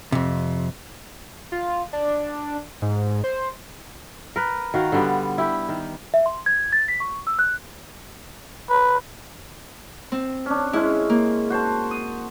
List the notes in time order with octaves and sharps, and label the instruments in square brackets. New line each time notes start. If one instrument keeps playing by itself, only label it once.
[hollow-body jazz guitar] F2 C3
[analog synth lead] F4
D4
G#2
C5
[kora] A#4 B4
D#3 F#4 F5
D3 G3 B3
E4 G4
D#3
[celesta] E5
C6
G#6
A6
B6
C#6
E6
F#6
[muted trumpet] B4
[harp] C4
[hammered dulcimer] C#4 D4
[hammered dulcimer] G#3 C#4 C6 [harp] E4
[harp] A#3
[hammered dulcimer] F#4 C5 A5
[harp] D#6